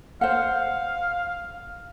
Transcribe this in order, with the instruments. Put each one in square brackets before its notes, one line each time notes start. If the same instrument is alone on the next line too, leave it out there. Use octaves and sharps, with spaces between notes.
[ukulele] C5 F#5 [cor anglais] F5